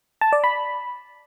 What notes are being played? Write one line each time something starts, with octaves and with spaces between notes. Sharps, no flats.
A5
D5
B5